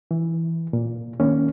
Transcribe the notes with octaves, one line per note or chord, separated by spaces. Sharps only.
E3
A#2
D#3 A#3 C#4